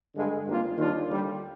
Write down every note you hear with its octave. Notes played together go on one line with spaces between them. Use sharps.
G2 D3 G#3
G#1 G2 D#3 A#3 F4
D#2 D#3 G3 D4 F4
D#2 D3 G3